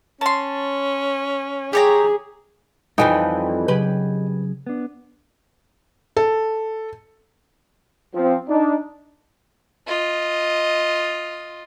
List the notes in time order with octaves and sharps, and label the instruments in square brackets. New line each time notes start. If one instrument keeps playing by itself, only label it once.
[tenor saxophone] C#4 [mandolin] A5 C6
[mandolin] G4 C#5 A#5 [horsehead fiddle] G#4
[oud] F2 E3 G3 [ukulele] D#4 G5 G#5 [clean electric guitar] D#5
[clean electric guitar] C#3 F#3 G#4 [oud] G4 B4
[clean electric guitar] B3 D4
[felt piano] A4
[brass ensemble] F3 C4
D4 D#4
[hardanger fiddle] F4 D#5